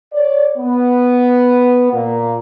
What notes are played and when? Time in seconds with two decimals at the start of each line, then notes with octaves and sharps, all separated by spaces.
0.13 C#5 D5
0.57 B3
1.92 A#2 A#3